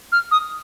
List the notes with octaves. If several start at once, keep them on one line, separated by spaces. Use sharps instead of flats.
F6
D#6